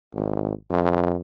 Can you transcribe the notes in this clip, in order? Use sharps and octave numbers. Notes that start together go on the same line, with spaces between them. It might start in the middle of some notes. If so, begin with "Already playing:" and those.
G#1
F2